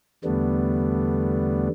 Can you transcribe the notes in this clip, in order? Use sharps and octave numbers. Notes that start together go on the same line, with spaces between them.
E2 D3 G3 A3 B3 D4